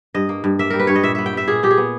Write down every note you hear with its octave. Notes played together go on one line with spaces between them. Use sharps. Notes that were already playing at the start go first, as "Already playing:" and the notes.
G2 D#5
A#3
G2
A#3 E5
G3 A#4
B4
G2 C#5
D#5
A#2 E5
B3 E5
G5
B3 E5
A#2 G#4
A#2 G4
G#4
B3